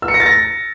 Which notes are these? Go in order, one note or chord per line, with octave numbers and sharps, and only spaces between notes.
E6
C#7
A#6
A6
A#6